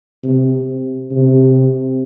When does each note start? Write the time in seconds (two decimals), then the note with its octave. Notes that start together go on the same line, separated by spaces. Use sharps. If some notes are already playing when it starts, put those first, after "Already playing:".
0.23 C3
1.12 C3